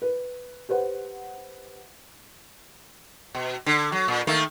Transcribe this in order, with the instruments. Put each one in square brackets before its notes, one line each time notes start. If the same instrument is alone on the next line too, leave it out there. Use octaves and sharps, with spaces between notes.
[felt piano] B4
G4 B4 C5 F#5
[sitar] B2
D3
F#3
A#2
D#3 A3 A#3